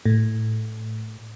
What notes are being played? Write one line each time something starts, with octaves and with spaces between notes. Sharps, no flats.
A2